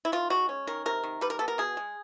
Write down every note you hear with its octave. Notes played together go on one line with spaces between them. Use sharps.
E4
D#3 F4
G#3 F#4
C#4
D#3 A#4
C3 A#4
D#3
G3 B4
A#4
B3 A4
A#4
B2 G#4
G#3